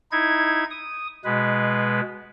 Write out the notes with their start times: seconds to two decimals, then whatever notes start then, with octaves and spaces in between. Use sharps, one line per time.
0.12 D#4 E4 G#6
0.71 D#6
1.25 B2 G#3 B4